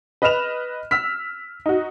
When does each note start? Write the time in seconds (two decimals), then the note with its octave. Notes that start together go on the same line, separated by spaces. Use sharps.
0.22 B4 D#5 B5 F6 E7 F7
0.91 E6 F6 B6
1.66 D#4 F#4